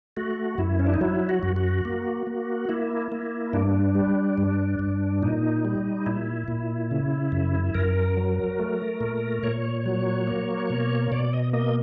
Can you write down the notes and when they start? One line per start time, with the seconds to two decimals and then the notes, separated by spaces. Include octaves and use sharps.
0.17 A3 F#4
0.58 F#2 E4
0.79 C#4
0.87 D4
0.94 D#4
1.01 F#3 E4
1.29 F#4
1.43 F#2
1.56 F#4
1.85 A#3
2.27 A#3
2.69 A#3 E4
3.12 A#3
3.53 G2 D4
3.95 G3
4.38 G2
4.79 G2
5.22 A#2 D#4
5.65 G3
6.06 A#2 E4
6.48 A#2
6.91 C#3
7.32 F#2
7.75 F#2 A#4
8.17 F#3
8.60 A3
9.01 A#2
9.43 A#2 C#5
9.86 F#3
10.27 A#3
10.70 B2
11.12 B2 D5
11.33 D#5
11.53 A#3 D#5